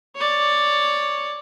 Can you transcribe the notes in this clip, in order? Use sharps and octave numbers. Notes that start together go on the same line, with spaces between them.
C#5 D5